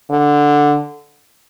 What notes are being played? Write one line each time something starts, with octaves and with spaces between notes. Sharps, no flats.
D3